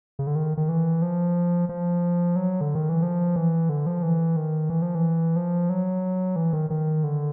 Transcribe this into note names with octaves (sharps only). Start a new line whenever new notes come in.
C#3
D3
D#3
D#3
E3
F3
F3
F#3
D3
D#3
E3
F3
E3
D3
F3
E3
D#3
E3
F3
E3
F3
F#3
E3
D#3
D#3
D3